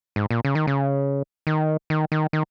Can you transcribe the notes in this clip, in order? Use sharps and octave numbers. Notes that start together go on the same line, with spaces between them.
G#2
A#2
C#3
D#3
C#3
D#3
D#3
D#3
D#3